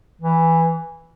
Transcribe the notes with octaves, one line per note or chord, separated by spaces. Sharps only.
E3